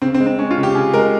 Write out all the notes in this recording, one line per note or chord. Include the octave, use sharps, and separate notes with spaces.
C#3 C4
C4
G#3
C4
G#3 C#4
F4
C#3
G4
C#3 G#4
G#3 A#4